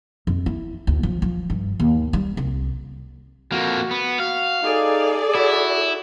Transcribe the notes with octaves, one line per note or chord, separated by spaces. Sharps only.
F2
E4
D2
F3
F3
G2
D#2
G3
C2
F2 A#3 F#4
B3
F#4 F5
D#4 G#4 A4 D5
E4 F#4